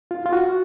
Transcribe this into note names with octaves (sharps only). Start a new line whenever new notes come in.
F4
F4
F#4